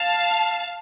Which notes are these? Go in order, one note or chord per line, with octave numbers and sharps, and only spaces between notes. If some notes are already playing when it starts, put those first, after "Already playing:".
Already playing: F5 A5